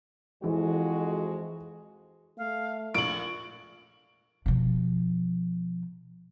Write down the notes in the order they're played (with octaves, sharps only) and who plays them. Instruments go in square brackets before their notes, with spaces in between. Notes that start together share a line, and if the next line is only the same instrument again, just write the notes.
[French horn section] F2 G#3 F#4 [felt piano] E3
[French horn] A3 [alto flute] F5
[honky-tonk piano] A#1 [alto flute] C#6 [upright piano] D7 F#7
[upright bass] B2 F3